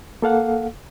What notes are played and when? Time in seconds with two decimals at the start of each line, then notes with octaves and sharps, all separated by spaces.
0.22 A#3 A4 F5 F#5